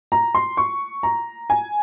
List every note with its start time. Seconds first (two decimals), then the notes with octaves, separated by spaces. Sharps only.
0.12 A#5
0.35 C6
0.57 C#6
1.03 A#5
1.50 G#5